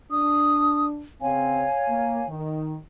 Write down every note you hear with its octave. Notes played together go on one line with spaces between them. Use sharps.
D4 D#6
C#3 C4 C#5 F5 G#5
A#3
D#3